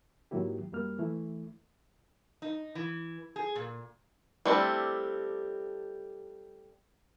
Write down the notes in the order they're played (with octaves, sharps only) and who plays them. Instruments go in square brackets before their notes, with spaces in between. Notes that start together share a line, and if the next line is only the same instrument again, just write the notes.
[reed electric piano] G#2 D#3 F#3 A#3 E4 G4
F#2 G3 A#3 F6
E3 A3 E4
[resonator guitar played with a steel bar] D#4
E3
G#4
A#2
[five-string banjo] G3 A3 C4 D4 E4